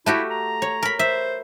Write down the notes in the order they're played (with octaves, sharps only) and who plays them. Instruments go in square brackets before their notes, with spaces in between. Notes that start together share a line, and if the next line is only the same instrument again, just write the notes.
[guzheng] A3 F#4 G4 [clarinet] E4
[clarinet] A#5
[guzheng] C#5
A#4 B5
[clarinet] C5 [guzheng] E5